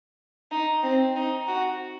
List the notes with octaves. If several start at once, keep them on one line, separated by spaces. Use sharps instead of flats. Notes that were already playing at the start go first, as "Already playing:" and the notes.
D#4
C4
D#4
F#4